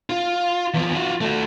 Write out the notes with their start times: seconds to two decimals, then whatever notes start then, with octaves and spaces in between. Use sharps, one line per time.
0.10 F4
0.74 E2 F3
0.95 F4 F#4
1.21 A3 F#4